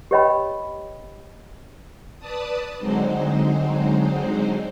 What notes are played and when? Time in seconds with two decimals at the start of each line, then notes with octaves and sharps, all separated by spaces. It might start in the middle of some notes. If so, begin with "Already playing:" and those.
0.11 G4 B4 C#5 D#5 G5 B5
2.19 B4 D5 A5 D#6
2.78 D3 F#3 G#3 C4 D#4 C5